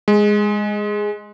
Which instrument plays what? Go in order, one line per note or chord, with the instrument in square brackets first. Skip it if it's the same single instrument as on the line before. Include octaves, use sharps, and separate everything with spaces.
[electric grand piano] G#3